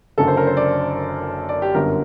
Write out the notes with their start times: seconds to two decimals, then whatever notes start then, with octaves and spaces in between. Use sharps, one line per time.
0.18 F#1 F#2 D3 A4
0.27 C5
0.37 A#4
0.47 C5
0.57 D5
1.49 D5
1.62 G4
1.75 G1 F#2 D3 A#4